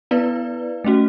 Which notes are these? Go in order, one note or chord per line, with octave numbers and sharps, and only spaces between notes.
B3 E4 B4 D5
A3 C#4 F#4